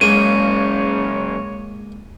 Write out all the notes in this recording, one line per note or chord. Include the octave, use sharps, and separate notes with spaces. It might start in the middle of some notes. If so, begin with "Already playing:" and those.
F#2 C#3 G#3 A#3 C#5 D#7